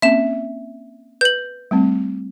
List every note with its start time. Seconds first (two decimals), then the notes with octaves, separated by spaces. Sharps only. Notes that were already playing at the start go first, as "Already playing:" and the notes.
0.02 A#3 C4 C#4 E5 E7
1.21 B4 G6 F#7
1.71 G3 A3 C4